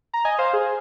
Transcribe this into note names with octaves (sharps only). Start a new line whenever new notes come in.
A#5
D#5 G#5
C5 F5
G#4